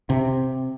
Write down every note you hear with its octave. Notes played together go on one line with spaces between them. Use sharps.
C3